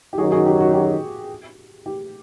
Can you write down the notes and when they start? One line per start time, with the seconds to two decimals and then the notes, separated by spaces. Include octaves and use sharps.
0.13 G4
0.18 F#2 D#3 F#3 F#4 G#4
0.32 F#4 G#4
0.46 G4
0.60 F#4
0.74 G4
1.86 G4